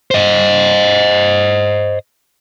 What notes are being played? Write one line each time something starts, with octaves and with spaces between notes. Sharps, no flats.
C5 D#5